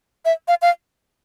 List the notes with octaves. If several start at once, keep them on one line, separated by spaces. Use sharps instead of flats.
E5
F5
F5